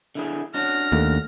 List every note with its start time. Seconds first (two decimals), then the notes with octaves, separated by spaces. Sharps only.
0.15 D3 E4 G#4
0.54 C#4 D4 F#4 F6 A#6
0.92 D#2 A3